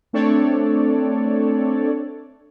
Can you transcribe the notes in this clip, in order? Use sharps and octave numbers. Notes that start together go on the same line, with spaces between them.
A3 C4 D4 A4 C#5 D5